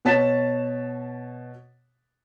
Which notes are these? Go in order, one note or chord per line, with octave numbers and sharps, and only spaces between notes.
B2 C#5 A5 A6 B6 E7